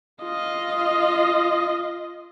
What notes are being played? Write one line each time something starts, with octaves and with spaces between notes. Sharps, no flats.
F4 D#5